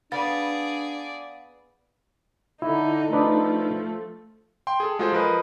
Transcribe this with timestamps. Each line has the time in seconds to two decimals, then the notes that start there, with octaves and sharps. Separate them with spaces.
0.12 B3 D4 G#4 D5 F5 A6
2.62 D3 D#4 E4
3.13 F3 A3 D4 D#4 B4
4.67 G5 C6
4.80 G#4 A4
4.99 G#3 F4 F#4 G#4 A4 C5
5.12 F3 A#4 B4 D#5